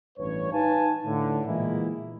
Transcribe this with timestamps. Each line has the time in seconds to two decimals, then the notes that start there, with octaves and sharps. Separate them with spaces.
0.19 A1 G2 B4 C#5
0.53 D#4 B4 F5 G#5 A5
1.06 A2 D3
1.46 A#2 E3 G#3 A#3 B3 E4